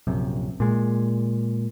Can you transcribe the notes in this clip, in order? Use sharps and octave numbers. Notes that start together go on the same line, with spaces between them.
A#1 F#2 C3
A#2 G#3